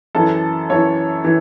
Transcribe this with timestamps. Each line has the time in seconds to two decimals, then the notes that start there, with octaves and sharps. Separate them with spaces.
0.15 F#2 E3 A4
0.70 F#2 E3 C#5
1.25 E3